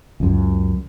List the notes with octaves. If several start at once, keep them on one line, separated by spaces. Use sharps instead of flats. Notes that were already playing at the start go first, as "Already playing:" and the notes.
C#2 F#2